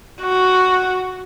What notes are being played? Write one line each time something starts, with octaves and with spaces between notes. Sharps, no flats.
F#4